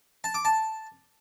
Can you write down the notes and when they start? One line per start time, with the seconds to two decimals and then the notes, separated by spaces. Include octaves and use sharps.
0.24 A5
0.34 D6
0.45 A5